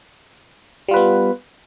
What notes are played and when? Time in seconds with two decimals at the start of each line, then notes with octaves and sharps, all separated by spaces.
0.88 G3
0.91 F4
0.94 B4
0.96 B3